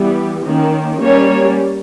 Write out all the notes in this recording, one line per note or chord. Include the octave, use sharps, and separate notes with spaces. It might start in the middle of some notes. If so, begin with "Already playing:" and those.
Already playing: E3 G3 B3
D#3 A#3 C#4
G3 A#3 C#4 C#5